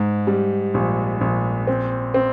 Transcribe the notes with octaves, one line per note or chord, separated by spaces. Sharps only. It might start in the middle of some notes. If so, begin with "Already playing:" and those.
Already playing: G#2
G3
A#1
A#1
C4
C4